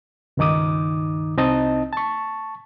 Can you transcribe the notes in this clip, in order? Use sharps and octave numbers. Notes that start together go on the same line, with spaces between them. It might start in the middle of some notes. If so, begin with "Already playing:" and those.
C#2 G2 D#3 D#4 D6 D#6
C2 C4 D#4 D#5 A5 D#6
A5 C#6